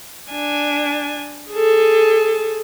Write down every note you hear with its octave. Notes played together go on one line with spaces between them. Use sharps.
D4 G#5
G#4 A4